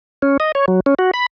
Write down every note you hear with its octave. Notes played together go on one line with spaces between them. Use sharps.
C#4
D#5
C#5
F#3
C#4
F#4
B5